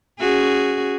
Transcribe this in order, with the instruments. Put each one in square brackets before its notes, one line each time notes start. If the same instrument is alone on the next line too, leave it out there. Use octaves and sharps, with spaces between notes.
[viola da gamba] C#4 F#4 G#4